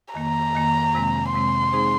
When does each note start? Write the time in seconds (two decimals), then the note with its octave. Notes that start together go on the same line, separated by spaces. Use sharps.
0.14 F2 D#3 A#3 A#5
0.53 F2 D#3 A#3
0.93 F2 C3 G#3 C4
1.33 F2 C3 G#3 C4 C6
1.72 G#3 C4 D#4 G#4 C5